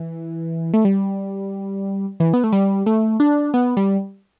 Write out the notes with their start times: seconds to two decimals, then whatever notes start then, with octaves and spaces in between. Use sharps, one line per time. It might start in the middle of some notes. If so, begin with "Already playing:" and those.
Already playing: E3
0.74 A3
0.85 G3
2.20 E3
2.33 B3
2.44 A3
2.52 G3
2.86 A3
3.20 D4
3.54 B3
3.77 G3